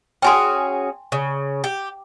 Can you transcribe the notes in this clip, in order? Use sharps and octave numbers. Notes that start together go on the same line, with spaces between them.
C#4 F#4 G#4 G5 G#5 C6
C#3
G4